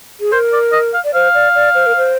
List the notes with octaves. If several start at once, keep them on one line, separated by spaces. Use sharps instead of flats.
G#4
A#4 C5
D5
D#5
F5
D5
C5 F5
D5
D5
C5
A#4
C5